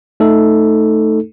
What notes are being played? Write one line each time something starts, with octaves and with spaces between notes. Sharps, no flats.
A3 D#4 A4